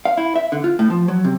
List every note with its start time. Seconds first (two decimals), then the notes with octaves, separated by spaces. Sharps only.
0.05 F5
0.17 E4
0.36 E5
0.52 D3
0.64 F4
0.79 A2
0.90 F3
1.08 F#3
1.25 C3